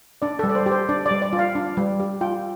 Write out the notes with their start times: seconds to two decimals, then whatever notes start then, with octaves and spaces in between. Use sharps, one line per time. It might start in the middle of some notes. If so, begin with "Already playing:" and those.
0.22 D4 D5
0.39 G3 A4
0.49 D5
0.55 C5
0.66 G4
0.71 C5
0.89 D4 D5
1.06 D5
1.11 G3
1.22 D5
1.33 F4
1.39 F5
1.55 D4
1.77 G3
2.00 G4
2.21 F4 G5